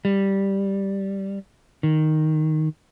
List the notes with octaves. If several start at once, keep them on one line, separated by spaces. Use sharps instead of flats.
G3
D#3